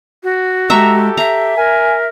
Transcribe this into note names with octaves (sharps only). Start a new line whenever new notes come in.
F#4
G#3 G4 A4 E5 A#5 C#6
E5 A#5
A#4 G#5